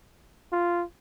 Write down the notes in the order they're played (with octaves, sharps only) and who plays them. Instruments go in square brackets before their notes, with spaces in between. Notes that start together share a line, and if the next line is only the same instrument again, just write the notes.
[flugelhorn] F4